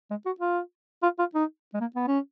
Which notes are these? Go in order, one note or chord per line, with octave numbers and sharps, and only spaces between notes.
G#3
F#4
F4
F4
F4
D#4
G#3
A#3
B3
C#4